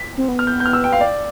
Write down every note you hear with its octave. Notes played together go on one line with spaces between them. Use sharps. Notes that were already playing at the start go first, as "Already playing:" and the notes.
Already playing: B6
C4
B3
F6
G6
G6
F6
E6
G5
F5
D5